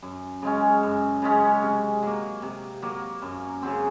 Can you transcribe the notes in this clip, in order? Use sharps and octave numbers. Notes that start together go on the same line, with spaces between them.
F#2
C#3 G#3 C#4
F#2
C#3 G#3 C#4
C3
F#3 A#3
C3
F#3 A#3
F#2
C#3 F#3 C4